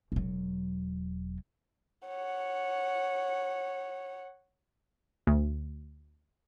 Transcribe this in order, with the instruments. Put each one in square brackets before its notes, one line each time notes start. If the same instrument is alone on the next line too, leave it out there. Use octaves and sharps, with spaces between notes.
[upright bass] E1 F#3
[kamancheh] C#5 F#5
[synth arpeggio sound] D2